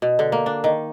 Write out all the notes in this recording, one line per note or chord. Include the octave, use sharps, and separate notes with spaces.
B2
D3
A#3
D4
D#3